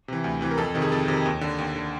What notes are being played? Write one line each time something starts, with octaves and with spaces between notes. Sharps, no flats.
C3 E3
D2
C3 E3
A#4
F2 A4
C3 D#3
G#4
F2 A4
C3 D#3
D#2
D3
D#2
D3